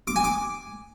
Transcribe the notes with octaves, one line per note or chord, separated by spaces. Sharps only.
D6
G#5
D6